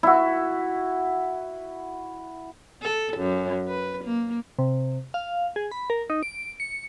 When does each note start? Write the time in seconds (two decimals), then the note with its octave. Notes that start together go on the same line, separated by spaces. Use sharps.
0.03 E4 F#4
2.82 A4
3.17 F#2
3.68 B4
4.04 A#3
4.59 C3
5.14 F5
5.56 G#4
5.71 B5
5.90 A#4
6.10 D#4
6.23 D7
6.60 C#7